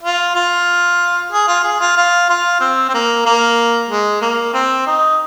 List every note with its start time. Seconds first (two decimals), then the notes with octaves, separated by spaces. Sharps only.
0.03 F4
0.35 F4
1.32 G#4
1.48 F4
1.64 G#4
1.80 F4
1.97 F4
2.29 F4
2.60 C4
2.89 C4
2.94 A#3
3.25 A#3
3.89 G#3
4.21 A#3
4.54 C4
4.87 D#4